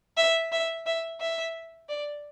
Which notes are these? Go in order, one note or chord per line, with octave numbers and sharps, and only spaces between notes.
E5
E5
E5
E5
D5